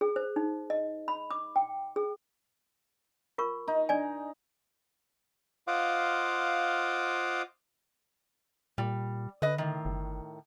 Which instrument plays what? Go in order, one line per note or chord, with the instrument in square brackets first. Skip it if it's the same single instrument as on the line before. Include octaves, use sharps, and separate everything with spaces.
[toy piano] G#4
C5
D#4
D#5
B5
D6
G5
G#4
F4 A#4 C#6
[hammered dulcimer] D#4
[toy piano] D4 D5 G#5
[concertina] F4 C5 D#5 F5 F#5 D6
[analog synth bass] A#2 [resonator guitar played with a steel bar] G3
[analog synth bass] D3 [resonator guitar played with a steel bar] B4 D#5
[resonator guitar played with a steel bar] A2 D#3
[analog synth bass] G1